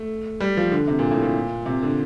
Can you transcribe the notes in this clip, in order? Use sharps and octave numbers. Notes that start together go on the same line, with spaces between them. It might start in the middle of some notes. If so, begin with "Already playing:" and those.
Already playing: A3
G3
F3
D3
C3
A#2
A2
A#2
C3
D3